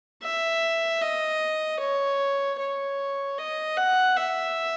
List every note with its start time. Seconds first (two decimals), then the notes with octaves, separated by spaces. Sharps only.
0.23 E5
1.02 D#5
1.80 C#5
2.59 C#5
3.38 D#5
3.77 F#5
4.16 E5